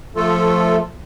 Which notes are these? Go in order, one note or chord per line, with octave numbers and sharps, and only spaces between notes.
F3 A3 F4 A4